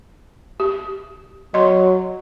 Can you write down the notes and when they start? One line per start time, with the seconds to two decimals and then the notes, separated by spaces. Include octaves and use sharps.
0.60 G4
1.54 F#3 D#5 C6